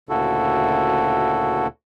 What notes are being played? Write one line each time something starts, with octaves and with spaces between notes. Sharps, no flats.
D2 A#2 C#3 E4 F#4 A4